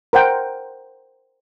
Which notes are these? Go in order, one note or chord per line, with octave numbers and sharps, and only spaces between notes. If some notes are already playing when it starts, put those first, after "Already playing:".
A#4 C5 F#5 G5